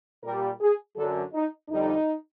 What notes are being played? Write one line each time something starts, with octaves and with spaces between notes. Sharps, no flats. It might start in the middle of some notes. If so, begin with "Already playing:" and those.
A#2 G3 A#4
G#4
F#2 D3 F#3 A4
D#4
F2 D3 G3 D#4